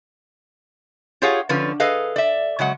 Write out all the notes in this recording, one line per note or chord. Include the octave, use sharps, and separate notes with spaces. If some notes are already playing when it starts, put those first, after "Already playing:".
F4 G4 G#4 C#5 F5 F#5
D3 F3 C#4 F4 B4
G#4 A4 B4 D#5 F5
D5 E5
C#3 F#3 G#3 F#5